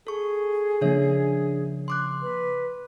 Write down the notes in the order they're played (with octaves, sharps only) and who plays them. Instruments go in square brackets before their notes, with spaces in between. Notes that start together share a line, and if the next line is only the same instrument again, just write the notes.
[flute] G#4 [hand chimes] A4 C#6
[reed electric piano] C#3 F3 A#3 [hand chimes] D4 C#5 E5
[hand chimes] C6 D6 F#6
[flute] B4